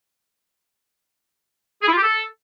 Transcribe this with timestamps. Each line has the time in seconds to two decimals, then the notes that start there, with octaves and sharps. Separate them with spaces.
1.82 G#4
1.87 E4
1.92 F4
1.97 G4
2.02 A4